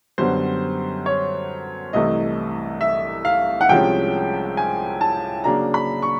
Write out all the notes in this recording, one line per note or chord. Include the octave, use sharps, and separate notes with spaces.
F#2 D3 G3 B3 C5
C#5
C2 C3 E3 A3 D#5
E5
F5
F#5
C2 C3 F3 G#3 C#4 G5
G#5
A5
C#3 F#3 A#3 D4 A#5
B5
C#6